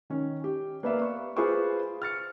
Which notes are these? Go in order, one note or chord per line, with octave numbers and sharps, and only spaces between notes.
D#3 C#4
G4
A#3 B3 B4 D5 E5 F5
C#6
F4 G#4 B4 C5 C#6 D6
F6 A6 C#7